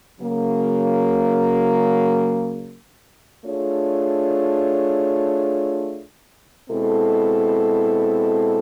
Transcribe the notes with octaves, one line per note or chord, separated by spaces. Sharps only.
C#3 F#3 A#3
A3 D4 F4 G#4 C#5
B2 G#3 C4 E4 A4